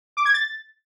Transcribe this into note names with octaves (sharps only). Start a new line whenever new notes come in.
D6
G#6
A6